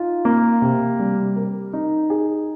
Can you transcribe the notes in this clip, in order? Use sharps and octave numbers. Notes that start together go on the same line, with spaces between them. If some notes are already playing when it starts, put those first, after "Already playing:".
Already playing: D#4 F4
A#3
C3
G3
A#4
D#4
G#4